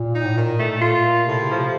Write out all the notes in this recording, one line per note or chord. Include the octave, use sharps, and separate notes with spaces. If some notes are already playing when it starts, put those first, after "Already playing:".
Already playing: A#2
D#4
A2
A#2 D#3
A3
A2
A#2 F4
A#3
A2 C3
C#3
F3
C3